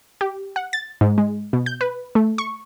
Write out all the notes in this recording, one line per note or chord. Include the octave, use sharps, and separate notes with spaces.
G4
F#5
A6
G#2
G#3
B2
G6
B4
A3
C#6